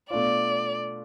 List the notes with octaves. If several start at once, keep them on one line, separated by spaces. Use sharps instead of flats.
B2 A3 D4 F4 D5